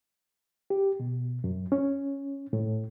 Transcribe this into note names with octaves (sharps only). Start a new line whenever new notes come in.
G4
B2
F#2
C#4
A2